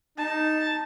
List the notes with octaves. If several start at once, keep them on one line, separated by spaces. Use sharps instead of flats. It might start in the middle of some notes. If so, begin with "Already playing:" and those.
D#4 A5